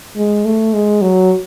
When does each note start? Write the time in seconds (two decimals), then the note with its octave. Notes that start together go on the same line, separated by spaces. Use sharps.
0.16 G#3
0.45 A3
0.74 G#3
1.02 F#3